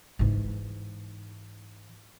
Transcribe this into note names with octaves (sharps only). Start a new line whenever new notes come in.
G#2 E3